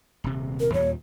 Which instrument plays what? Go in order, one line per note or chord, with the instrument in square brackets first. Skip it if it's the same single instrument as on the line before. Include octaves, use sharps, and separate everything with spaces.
[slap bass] D#1 C3
[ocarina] A#4
[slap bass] D#2 A#2 G3 [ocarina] C#5